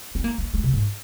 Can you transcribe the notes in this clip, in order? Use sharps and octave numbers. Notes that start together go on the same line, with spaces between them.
C4
A#3
A#3
G#3
C3
G#2